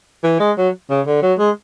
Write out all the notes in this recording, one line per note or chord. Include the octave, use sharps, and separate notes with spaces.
E3
G#3
F#3
C#3
D3
F#3
G#3